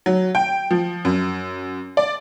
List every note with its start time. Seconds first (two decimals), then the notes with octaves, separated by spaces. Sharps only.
0.06 F#3
0.35 G5
0.71 F3
1.05 F#2
1.97 D5